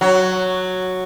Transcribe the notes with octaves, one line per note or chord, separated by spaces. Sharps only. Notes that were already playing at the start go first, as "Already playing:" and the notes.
F#3